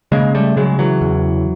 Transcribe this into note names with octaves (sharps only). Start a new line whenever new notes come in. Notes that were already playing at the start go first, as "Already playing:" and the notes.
C#3 G#3 A#3
G3 A3
C#3 F#3 G#3
E3 F#3
E2